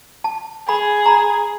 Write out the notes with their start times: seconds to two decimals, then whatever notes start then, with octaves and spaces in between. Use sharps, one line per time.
0.24 A5
0.69 G#4 B5
1.06 A#5 B5